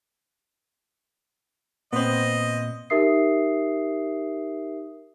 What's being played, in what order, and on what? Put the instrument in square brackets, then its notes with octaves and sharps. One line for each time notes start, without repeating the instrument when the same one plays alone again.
[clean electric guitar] A#2 [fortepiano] B3 C4 [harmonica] D#5
[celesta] D#4 G4 A#4 E5 D#6 C7